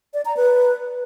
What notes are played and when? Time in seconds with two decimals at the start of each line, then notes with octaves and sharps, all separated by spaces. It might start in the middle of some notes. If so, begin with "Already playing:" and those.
0.14 D5
0.25 A#5
0.37 B4